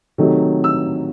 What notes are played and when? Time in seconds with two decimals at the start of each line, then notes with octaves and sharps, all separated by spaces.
0.18 C3 D#3 F#3 A3
0.64 E6